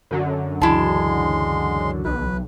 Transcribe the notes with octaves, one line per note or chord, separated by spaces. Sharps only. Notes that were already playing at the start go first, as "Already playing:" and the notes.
F#2 D3 F#3
C#2 E3 G#3 E4 A5 C6
B1 B4